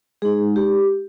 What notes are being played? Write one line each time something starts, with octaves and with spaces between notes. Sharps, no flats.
G#3 D#4 G#4
G4